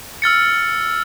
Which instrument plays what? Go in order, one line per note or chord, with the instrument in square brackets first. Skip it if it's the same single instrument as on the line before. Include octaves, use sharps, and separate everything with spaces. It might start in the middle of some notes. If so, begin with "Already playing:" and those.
[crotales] E6 F6 A6 C#7